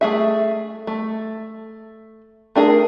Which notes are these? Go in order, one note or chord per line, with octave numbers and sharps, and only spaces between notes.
A3 G#4 E5
A3
A3 D4 G#4 A#4